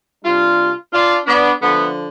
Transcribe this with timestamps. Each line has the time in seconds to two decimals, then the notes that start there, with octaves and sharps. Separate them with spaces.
0.23 C3 G3 D4 F4
0.92 D4 F4
1.27 B3 D4
1.61 D3 F3 A3 B3